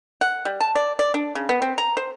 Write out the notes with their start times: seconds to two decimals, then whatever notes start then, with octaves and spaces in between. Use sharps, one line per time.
0.21 F#5
0.45 G3
0.61 A5
0.75 D5
0.99 D5
1.14 D4
1.35 C#3
1.49 B3
1.62 C4
1.78 A#5
1.97 C5